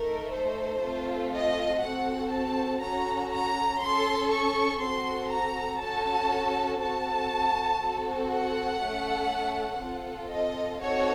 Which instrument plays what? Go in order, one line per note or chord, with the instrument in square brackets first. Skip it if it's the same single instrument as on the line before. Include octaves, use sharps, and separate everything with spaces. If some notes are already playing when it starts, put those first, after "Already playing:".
Already playing: [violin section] A3 D#4 A4 A#4
C5
A3 C4 F4 A4
D#5
C4 F#4 A4 F#5
A5
C#4 F#4 A4 A#5
A#5
C#4 A4 C6
C#6
C4 F#4 A4 C6
A#5
C#4 F#4 A4 A5
C4 F#4 A4 A5
C4 F#4 A4
F#5
A3 C#4 A4
C4 F4 A4
D#5
C4 D#4 F#4 A4 C#5